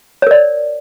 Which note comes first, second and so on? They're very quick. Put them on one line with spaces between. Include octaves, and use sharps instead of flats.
C#5 A#4 D5